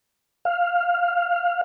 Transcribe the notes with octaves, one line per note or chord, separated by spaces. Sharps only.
F5